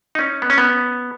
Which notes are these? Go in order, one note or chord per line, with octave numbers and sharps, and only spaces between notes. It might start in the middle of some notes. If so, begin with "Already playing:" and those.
D#4
C#4
B3
C#4
B3